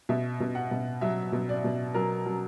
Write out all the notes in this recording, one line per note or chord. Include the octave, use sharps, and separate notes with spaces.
B2 E5
B2
F#5
B2
F#3 E5
B2
D5
B2
F#3 A#4
F#3